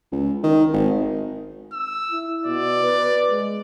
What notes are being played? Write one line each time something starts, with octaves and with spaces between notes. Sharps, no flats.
C#2
D#3
G#1
E6
E4
B2 D5
B4
G#3